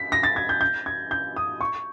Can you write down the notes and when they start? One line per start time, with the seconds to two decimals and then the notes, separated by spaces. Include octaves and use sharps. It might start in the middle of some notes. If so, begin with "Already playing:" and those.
Already playing: B6
0.12 A#6
0.23 A6
0.36 G#6
0.49 G6
0.61 G6
0.86 G#6
1.11 G6
1.36 D#6
1.61 C#6